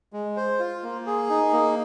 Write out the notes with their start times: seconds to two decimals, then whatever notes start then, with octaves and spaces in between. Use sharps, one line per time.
0.13 G#3
0.37 C5
0.59 F4
0.83 A#3
1.07 G#4
1.29 D#4
1.53 A#3